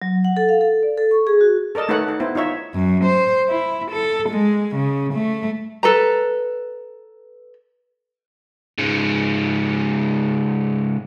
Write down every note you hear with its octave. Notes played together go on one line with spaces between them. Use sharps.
F#3
F#5
A4
F5
A4
D5
A4
C#6
G#4
F#4
A4 A#4 D5 D#5 A5
A3 D#4 A4 B4 C#5 F#5
D#4
B3 E4 C5
D#4 F4 C#5 E5
F#2
C5
E4
A4
G#3
C#3
A3
A4 B4 A#5
G#2 C#3